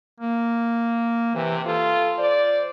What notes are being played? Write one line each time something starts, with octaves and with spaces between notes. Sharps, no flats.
A#3
C3 E3
F4 A4
C5 D5